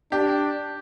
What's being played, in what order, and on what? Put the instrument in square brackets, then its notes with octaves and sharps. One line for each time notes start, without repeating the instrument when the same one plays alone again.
[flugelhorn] D4 [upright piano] G4